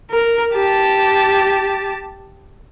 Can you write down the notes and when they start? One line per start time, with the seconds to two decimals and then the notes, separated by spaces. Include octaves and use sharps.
0.11 A#4
0.53 G4 A5